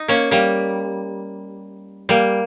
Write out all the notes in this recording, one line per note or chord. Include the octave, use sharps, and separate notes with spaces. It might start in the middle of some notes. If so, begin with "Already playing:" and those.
Already playing: D#4
A#3 C#4
G3 A#3
G3 A#3